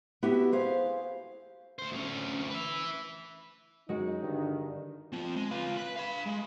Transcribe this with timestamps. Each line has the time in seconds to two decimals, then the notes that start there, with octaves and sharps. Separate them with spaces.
0.23 B3 E4 F#4 G4 E5
0.52 G#4 C5 F5
1.79 D2 C5
1.92 D2 C#4
2.50 B4 E5
3.89 F#2 G#3 D#4 F#4
4.22 G2 D3 D#3
5.13 C4 F4
5.36 G#3
5.51 F4 B4
5.77 B4
5.97 F5 B5
6.27 G#3